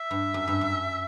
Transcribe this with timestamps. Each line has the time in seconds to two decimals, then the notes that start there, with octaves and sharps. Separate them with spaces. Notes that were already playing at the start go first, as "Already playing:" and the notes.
Already playing: E5
0.11 G2
0.34 F#2
0.48 G2
0.61 F#2